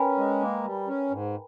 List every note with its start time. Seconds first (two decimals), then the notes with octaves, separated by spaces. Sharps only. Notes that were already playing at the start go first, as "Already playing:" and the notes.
Already playing: C#4 A#4 B4 G5 G#5 A#5 B5
0.17 G#3
0.41 A#3
0.64 G3
0.88 C#4
1.11 G#2